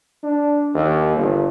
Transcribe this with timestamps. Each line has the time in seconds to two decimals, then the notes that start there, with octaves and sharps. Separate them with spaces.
0.23 D4
0.75 D#2
1.16 G1